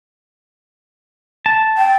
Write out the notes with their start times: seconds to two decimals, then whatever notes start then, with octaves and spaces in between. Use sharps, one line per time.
1.46 A5
1.78 G5